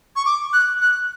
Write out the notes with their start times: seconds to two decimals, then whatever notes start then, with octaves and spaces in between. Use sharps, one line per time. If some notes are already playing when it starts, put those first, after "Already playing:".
0.16 C#6
0.25 D6
0.53 F#6
0.81 F#6